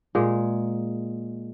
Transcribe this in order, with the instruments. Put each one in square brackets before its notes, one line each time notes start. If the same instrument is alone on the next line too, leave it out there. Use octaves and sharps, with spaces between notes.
[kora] A#2 G#3